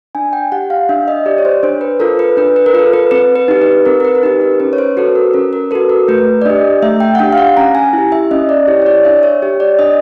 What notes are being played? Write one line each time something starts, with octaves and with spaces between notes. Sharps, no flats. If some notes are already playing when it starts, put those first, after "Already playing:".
D4 G#5
G5
G4 F#5
F5
D4 E5
D#5
G4 D5
C#5
C5
D4 C5
B4
F4 A4 A#4
B4
D4 B4
B4
A#4
F4 B4
A4
B4
C4 B4
B4
D#4 G4
B4
C4 A#4
A#4
B4
A#4
D#4 G4 B4
A#4
C#4 B4
C#5
C5
F#4 A4 B4
A#4
C#4 A#4
A#4
F#4 A4 B4
A#4
A3 B4
D5
D4 G4 D#5
A3 E5
G5
F#5
D4 G4 G5
F5
F#5
C#4 A#5
G#5
E4 G4
E5
C#4 D#5
D5
E4 G4 C#5
C#5
D5
D4 E5
C#5
G4 C#5
D5
D4 D#5